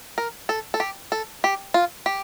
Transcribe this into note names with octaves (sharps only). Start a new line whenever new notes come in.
A#4
A4
A4
G4
A4
G4
F4
G4